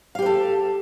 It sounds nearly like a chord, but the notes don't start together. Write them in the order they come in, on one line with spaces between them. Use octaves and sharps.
F5 G4 B4 A4